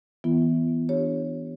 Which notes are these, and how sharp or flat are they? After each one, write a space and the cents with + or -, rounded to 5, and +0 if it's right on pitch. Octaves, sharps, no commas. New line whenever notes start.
E3 -15 B3 +0 F4 -45
D4 +10 G4 +0 C#5 +0